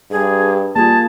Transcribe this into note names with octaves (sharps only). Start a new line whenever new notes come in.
G2 G#4
G3 A#3 F4 G#4 A5